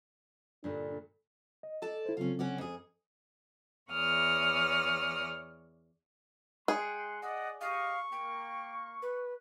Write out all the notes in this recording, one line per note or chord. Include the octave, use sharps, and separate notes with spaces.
G2 A#2 D3 D4
D#5
A4 D5 A5
E4 C5
C#3 F#3 C4 C#4 F4
C#4 F#4 D5
F2 G#4
E2 C#5 D5 D#6 F6
G#3 G#4 F#5 G5 C6
D5 D#5 F#5
G4 D#5 F5 C#6
A#3 G5
B4